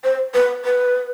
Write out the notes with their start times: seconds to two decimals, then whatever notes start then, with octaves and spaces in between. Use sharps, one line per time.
0.04 C5
0.34 B4
0.65 B4